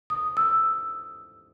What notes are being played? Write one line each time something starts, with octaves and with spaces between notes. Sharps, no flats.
D#6
E6